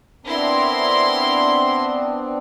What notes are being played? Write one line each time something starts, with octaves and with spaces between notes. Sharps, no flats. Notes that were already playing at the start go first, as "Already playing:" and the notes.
B3 C4 D4 E4 A#4 C6